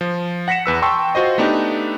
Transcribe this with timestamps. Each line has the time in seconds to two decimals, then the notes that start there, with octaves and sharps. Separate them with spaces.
0.01 F3
0.48 F#5 A#6 B6 C#7 E7
0.66 E2 B4 E6
0.82 G5 A5 C6 C#6 E6
1.15 F4 F#4 C5 D#5
1.38 A3 B3 D4 D#4 G4